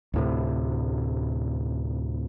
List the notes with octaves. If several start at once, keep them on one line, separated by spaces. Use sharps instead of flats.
D2 A2 C3